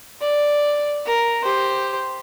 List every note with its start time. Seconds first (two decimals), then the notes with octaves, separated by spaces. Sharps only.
0.22 D5
1.06 A#4
1.44 G4 C5